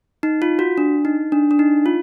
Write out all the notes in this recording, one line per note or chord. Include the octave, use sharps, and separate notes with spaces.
D#4
F4
F#4
D4
D#4
D4
D4
D#4
F4